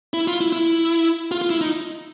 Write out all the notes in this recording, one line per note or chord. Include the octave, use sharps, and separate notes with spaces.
E4
F4
E4
E4
F4
F4
E4
D#4